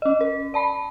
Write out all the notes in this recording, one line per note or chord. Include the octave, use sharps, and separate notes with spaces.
C#4 D#5
A#4
D5 A5 B5